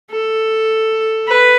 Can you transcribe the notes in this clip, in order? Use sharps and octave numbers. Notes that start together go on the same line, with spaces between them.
A4
B4